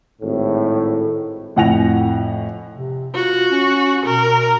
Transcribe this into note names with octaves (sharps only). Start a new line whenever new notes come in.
G#1 A2
F2 A2 F#5 G#5 A#6 F7
C3
F4 F#4
C#4
B2 A#4